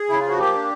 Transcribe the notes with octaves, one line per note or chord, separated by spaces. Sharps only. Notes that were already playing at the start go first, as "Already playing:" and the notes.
Already playing: G#4
C#3 E4
F3 F4
F#4
A#3 G4
D4